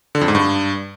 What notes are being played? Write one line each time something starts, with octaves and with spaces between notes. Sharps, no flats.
D3
F2
G#2
G2